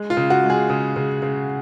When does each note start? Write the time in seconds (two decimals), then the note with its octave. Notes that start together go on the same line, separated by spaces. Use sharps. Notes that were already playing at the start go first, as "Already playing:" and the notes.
Already playing: G#3
0.10 F4
0.17 C#3
0.30 F#4
0.44 G#3
0.50 G#4
0.70 C#3
0.96 C#3
1.22 C#3